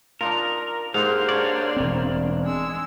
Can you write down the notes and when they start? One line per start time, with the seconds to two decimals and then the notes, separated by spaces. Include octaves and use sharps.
0.21 D4 D#4 F4 A#4
0.94 G#2 A#3 G4 B4 C5 F5
1.29 D4 C#5 D5
1.76 E1 C4
2.44 G#3 E6